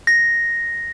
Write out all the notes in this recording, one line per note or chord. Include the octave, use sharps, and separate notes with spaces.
A#6